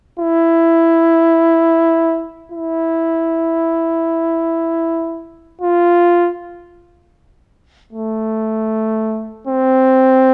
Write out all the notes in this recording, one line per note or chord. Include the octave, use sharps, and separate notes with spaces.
E4
E4
F4
A3
C4